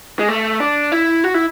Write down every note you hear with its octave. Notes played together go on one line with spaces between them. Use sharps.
G#3
A3
D4
E4
F#4
E4